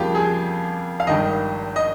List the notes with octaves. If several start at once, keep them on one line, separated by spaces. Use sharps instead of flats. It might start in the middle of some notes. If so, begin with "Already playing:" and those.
Already playing: F2 C#3 G3 A#3 F4 G4
G#4
F5
G#1 G2 D#3 D#5
D#5